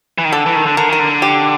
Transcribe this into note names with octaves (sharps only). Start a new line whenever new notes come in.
E3
D#3
D3 A4
E3
D#3
D3
D3 A#4
D#3 A#4
D3
G4